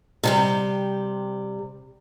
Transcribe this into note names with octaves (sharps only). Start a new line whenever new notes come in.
C3 G3 G4